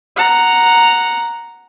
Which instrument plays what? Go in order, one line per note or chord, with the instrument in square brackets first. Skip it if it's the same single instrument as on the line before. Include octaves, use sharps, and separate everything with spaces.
[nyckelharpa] F#5 A#5